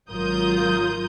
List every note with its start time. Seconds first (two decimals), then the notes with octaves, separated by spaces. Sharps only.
0.10 G#1 F#3 F4 A#4 D#6 G6